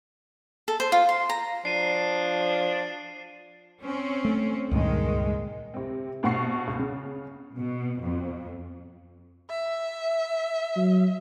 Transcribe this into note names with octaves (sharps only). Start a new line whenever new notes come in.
A4
C5
F4
C6
A#5
F3 D4 C7 D#7
C4 C#4
A3
C#2 G2 A#2 D#3 G#3
C3 C4
A#1 B2 F#5 C#6 C7
C#2
C#3
B2
F2
E5
F#3